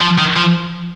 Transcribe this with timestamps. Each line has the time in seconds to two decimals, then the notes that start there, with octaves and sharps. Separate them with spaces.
0.01 F3
0.18 D#3
0.36 F3